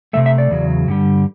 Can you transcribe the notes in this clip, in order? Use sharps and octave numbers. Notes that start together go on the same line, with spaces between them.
C3 E3 A3 E5
E5
D5
E2 C#3 F#3
G2 D3 G3